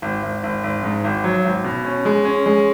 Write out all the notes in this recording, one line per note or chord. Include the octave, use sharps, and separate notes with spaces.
G#1
G#1
G#1
G#1
G#2
G#1
F#3
G#1
B2
C#4
G#3
C#4
G#3